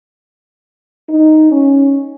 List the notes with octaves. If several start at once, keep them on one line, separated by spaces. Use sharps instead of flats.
D#4
C#4